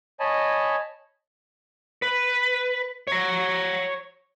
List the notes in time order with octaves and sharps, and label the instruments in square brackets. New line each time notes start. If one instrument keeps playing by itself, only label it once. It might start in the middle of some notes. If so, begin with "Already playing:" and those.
[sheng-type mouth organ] C#5 D#5 G#5 A5 B5
[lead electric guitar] B4
C#5 A#5